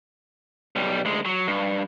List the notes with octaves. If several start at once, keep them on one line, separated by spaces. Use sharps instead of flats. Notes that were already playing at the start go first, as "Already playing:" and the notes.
B1 G3
D2 G#3
F#3
G2